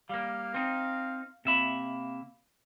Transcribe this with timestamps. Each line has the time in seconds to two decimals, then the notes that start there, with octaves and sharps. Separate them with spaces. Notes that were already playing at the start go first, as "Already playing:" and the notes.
0.09 G3 A#3 F5
0.54 C4 D#4
1.45 C3 A#3 E5 B5